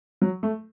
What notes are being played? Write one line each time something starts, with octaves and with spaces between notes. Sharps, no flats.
F#3
A3